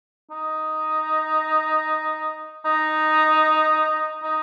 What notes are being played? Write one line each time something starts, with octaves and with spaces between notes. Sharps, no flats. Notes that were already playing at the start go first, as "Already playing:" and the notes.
D#4
D#4
D#4